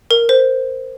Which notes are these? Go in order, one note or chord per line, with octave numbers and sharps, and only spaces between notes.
A#4
C5